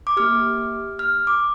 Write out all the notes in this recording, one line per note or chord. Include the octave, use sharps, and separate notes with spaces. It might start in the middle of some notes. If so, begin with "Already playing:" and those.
D6
A#3 G4 F6
F6
D6